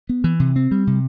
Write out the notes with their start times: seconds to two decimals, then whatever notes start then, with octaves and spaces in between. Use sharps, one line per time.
0.09 B3
0.24 E3
0.40 C3
0.56 C4
0.71 G3
0.87 C3